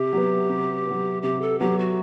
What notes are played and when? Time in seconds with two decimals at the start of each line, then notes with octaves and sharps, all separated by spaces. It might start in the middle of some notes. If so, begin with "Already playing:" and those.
Already playing: C3 G4
0.13 F#3 B3
0.49 C3
0.86 F#3 B3
1.23 C3 G4
1.41 A4
1.59 F#3 B3 G4
1.79 F#4